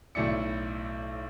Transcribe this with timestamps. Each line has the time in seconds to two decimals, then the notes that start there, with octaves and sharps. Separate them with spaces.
0.15 B1 A2 E4 D5 C#7